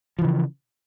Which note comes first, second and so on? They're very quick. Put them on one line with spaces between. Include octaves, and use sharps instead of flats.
F3 E3 C#3